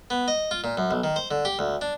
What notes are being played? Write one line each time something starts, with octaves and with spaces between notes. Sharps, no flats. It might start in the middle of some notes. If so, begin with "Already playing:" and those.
B3
D#5
F4
A#2
F#2
B1
D#3
C5
D3
G4
D2
D4